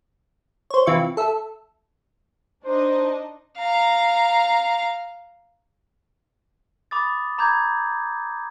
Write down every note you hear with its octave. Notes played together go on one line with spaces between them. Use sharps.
C5 C#5
C3 E3 F4 E5 C#6
A4 E5
D4 D#4 C5 D#5
F5 A#5
B5 D6 D#6 A6
A#5 B5 D6 G6 G#6